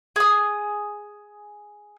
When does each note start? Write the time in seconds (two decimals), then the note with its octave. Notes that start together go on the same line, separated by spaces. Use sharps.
0.16 G#4 D#6